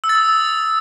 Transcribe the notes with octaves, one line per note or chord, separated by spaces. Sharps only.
E6
A6
D#6